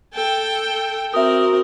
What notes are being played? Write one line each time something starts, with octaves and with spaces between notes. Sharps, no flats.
A4 G5
C4 F#4 A#4 E5 D#6